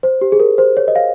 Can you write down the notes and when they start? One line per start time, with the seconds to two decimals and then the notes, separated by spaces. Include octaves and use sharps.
0.03 C5
0.21 G4
0.32 G#4
0.40 A#4
0.58 C5
0.77 C#5
0.88 D#5
0.96 F5